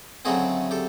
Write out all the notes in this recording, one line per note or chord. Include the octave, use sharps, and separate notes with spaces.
D2 C#3 F#3 A3 C4 F#4 G#4
G4 A4